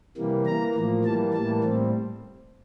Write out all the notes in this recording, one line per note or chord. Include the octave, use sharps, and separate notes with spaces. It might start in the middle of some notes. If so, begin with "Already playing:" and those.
C3 E3 G3 A#3
E3 A#3 A#5
A2 F3 A#3
E3 G3 A#3 A5
A2 E3 G3 A#3 A5
A2 G3 C4